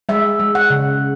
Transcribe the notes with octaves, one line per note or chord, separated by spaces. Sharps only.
G#3 E5
G#3
F#5
C#3